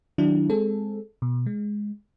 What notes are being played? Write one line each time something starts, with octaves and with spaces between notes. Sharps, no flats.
D#3 F#3 D4 E4
G#3 C4 G#4 A4
B2
G#3